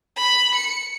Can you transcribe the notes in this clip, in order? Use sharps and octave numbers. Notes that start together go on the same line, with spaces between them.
B5
C#7